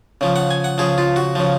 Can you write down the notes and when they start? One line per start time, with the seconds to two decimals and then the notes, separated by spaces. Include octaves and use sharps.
0.21 C#3 F3
0.36 F#5
0.51 G#5
0.64 F#5
0.78 C#3 F3 G#4
0.98 F4
1.16 F#4
1.35 C#3 F3